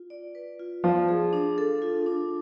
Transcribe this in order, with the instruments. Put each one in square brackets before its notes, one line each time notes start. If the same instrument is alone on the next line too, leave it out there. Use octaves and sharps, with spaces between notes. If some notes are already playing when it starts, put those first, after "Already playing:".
Already playing: [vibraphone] F4
D5
B4
F4
[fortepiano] F3 [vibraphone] D5
[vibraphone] G#4
D4
A4
F4
D4